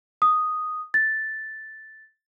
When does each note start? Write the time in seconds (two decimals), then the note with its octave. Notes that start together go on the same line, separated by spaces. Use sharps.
0.22 D#6
0.94 A6